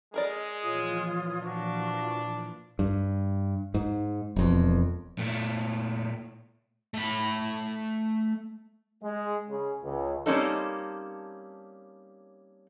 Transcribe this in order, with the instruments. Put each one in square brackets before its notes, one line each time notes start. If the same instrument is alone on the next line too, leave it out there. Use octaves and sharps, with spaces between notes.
[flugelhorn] G#3 [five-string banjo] G#4 A#4 D5 [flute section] D#5 [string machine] G#5
[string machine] A#2 E3 F3 [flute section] F4 C#5 D#6
[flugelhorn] D4 [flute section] F#4 F5 C#6
[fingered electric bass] G2
G#2
E1 F2
[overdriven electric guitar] A#2 A3
[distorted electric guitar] A3 B5
[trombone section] G#3
C#3
C#2
[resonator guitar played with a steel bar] G3 A#3 C4 C#4 D#4 A4